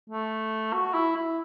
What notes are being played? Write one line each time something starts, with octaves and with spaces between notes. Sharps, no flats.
A3
F#4
E4
E4